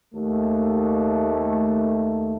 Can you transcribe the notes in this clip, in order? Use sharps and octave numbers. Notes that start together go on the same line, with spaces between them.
D#2 A3